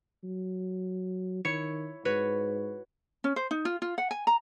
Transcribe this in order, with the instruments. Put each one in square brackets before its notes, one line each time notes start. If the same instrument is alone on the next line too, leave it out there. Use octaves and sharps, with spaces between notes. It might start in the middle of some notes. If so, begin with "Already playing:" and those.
[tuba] F#3
[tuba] D#3 [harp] E4 C#5 C#7
[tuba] G#2 [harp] F#4 B4 C#5
[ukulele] C#4
C5
D#4
F4
F4
F#5
G#5
A#5